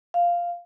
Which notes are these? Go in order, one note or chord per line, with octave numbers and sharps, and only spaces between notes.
F5